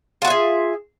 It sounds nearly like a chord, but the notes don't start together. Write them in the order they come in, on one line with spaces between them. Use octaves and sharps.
F4 F#4 E5 G#4